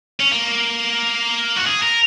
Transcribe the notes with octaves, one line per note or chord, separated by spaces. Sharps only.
C#4
A#3
F#4
G#4
A#4